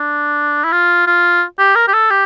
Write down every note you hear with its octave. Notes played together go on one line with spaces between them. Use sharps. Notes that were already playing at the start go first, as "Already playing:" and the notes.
Already playing: D4
E4
F4
F4
G4
A#4
G4
A4
G4